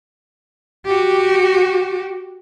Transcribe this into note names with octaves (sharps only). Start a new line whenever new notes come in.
F#4 G4